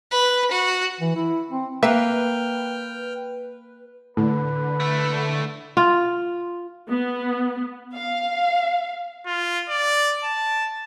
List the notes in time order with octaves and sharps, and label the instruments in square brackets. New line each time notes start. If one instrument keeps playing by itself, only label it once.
[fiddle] B4
F#4
[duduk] E3
E4
C4
[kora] A#3 [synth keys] B4 [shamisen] E5 [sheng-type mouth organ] G5 F6
[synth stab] A2 [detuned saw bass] D3 [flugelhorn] B4
[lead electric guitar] A3 E4
[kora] F4
[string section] B3
F5
[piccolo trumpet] F4
D5
A5